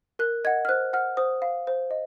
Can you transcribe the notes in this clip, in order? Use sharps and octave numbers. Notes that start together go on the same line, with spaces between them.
A#4 F#6
D#5 F#5 G#6
F6
C5 F#6
F#5 F6
C5 D#6
F5
C5
D#5